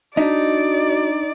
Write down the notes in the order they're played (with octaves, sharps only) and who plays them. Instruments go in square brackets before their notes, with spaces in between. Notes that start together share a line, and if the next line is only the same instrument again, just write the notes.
[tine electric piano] D4 [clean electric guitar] D#4 [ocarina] F#4 [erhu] D5